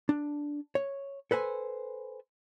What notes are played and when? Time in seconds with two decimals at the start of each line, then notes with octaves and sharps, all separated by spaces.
0.09 D4
0.75 C#5
1.31 A4 B4 C5 G#5